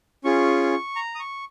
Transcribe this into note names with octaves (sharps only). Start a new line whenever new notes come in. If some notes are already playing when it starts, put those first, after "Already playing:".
C#4 F4 G#4 C#6
A#5
D#6
C#6